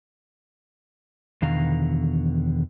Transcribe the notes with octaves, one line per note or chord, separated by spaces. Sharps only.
E2 B2 D3 D#3 F5 A#5